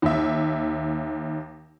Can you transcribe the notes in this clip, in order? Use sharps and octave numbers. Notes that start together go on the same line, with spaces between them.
D#2 E5